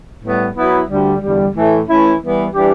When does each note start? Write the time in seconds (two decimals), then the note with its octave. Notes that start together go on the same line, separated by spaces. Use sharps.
0.22 A2 G3 B3
0.54 F#3 B3 E4
0.88 D2 D3 G3
1.21 E2 D3 G3
1.54 A2 E3 A3
1.87 E3 A3 C#4 E4
2.20 E3 G3 B3
2.54 E3 G3 D4 G4